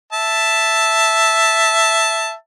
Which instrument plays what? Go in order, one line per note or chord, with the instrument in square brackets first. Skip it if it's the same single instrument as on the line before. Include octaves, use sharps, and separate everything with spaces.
[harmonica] E5 A5